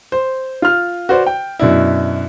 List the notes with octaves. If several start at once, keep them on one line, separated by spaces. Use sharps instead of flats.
C5
F4 F6
F#4 B4 C5 D5
G5
F#2 B2 D4 E4